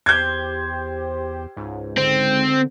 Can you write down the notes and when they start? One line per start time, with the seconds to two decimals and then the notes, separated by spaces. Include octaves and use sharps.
0.06 E2 G4 C5 G6 G#6
1.57 C#2 G#2
1.97 D3 C4